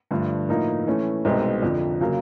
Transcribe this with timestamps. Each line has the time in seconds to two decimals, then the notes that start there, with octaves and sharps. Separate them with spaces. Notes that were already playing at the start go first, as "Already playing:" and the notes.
0.11 G2 D3 F3 A3
0.49 A2 F3 A#3 D#4
0.87 E3 A3 C#4 E4
1.25 C2 B2 G#3 C4 D#4
1.62 F2 D3 F3
2.01 C#3 F#3 A#3